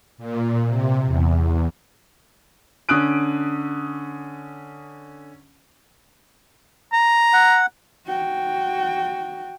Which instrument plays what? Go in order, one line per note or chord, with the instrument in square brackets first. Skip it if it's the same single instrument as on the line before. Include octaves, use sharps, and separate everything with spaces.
[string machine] A#2
C3
E2
[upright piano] D3 C#4 D#6 F#6 D7
[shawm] A#5
[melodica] F#5
[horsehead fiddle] F#4 G5